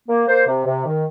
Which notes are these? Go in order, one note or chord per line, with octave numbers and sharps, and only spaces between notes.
A#3
A#3 C5
C3
C3
D#3